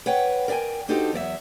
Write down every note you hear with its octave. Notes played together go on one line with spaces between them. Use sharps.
B4 C#5 F#5 G5
A#4 D5 E5 G5 G#5
D4 D#4 F#4 G4 A4 C5
E2 F#3 D5 E5